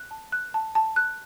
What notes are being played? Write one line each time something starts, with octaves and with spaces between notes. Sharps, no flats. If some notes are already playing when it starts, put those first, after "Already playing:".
Already playing: F#6
A5
F#6
A5
A5
F#6